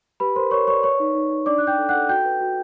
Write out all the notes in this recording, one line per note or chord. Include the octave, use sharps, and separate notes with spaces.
G4 B4 B5
A#4 C5 C6
A#4 C#5 C#6
C#5 D5 C#6
B4 C#5 C#6
D#4
D#4
D#4
D4 D5 D6
D5 F#6
G5 G6
A4
F#5 F#6
A4
F#4 G5 G6
B4
F#4